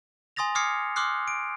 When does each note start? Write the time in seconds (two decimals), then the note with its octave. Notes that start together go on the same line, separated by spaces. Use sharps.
0.36 G#5 C6 D#6 A6 A#6 F7
0.55 D6 D#6 F6 G#6 C7 C#7
0.96 C6 D6 D#6 F6 F#6 C7
1.28 D7